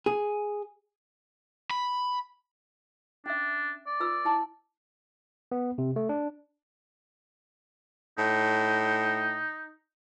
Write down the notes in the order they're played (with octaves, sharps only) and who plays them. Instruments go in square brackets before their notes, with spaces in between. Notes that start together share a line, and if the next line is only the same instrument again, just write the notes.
[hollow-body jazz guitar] G#4
[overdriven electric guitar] B5
[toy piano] C#4 E5 [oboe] D4
[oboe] D5
[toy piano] F4 B4 E6
E4 A5 C6
[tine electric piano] B3
C3
A3
D4
[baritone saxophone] A2 [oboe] D#4